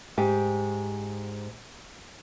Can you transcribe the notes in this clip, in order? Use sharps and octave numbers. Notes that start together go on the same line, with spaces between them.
G#2 G4